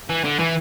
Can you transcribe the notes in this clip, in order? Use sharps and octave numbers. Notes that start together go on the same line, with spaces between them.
E3
D3
E3